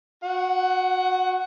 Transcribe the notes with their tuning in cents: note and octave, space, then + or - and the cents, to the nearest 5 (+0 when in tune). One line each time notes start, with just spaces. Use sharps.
F#4 -20 F#5 +15